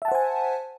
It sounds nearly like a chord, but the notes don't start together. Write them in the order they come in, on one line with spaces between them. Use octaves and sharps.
E5 A5 F#5 C5 G#5